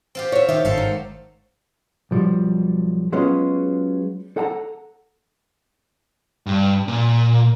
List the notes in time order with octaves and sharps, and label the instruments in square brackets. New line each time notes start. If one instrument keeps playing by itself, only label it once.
[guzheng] C4 F4 G4
[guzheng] F#4 E5 [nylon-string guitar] C#5
[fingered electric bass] D#3 [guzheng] F4 G4 [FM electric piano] E5
[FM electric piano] G1 [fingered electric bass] G#2 D3 D#3 [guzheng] C4 A4 F5
[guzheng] F#3
[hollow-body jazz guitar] B1 F3 G3
F#3 G#3 B3 C#4 F4
A4 F#5 A5 A#5
[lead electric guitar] G2
A#2